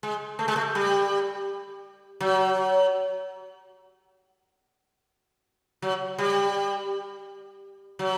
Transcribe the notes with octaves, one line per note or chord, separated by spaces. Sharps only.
G#3
A3
G#3
A3
G3
F#3
F#3
G3
F#3